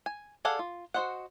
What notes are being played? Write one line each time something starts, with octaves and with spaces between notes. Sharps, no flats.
G#5
G#4 A4 D5 F5 F#5
F4
F#4 B4 C5 D#5 F#5